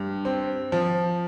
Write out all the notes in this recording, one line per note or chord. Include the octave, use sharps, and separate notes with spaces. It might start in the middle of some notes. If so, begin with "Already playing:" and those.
Already playing: G2
C4
F3